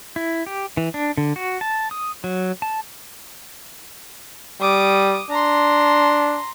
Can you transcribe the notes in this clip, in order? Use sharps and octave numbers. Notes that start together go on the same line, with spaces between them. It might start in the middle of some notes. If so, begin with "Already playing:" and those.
E4
G4
E3
D4
D3
F#4
A5
D#6
F#3
A5
G3 D6 D#6
D4 A#5 C6